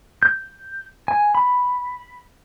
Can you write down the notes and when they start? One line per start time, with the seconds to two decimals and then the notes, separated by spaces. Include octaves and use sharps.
0.23 G6
1.08 G#5
1.35 B5